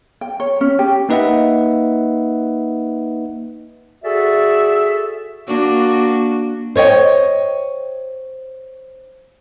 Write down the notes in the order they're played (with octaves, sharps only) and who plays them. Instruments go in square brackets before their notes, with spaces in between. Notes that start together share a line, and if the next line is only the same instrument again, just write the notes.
[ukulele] G5
C#5
C#4
G4
[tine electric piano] A#3 D#4 B4 D#5 E5 F#5
[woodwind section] F#4 G#4 A4 D5 E5
[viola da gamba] A#3 D4 F#4
[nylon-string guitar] C5 C#5 D#5 G5